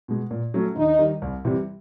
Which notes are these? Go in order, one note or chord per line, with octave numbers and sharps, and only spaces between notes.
B2 G#3
A#2
F#3 A3 C#4
D#2 D#4
D#3 G3
C2
C3 E3 G3